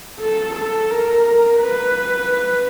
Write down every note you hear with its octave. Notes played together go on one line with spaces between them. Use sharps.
A4
A4
A#4
B4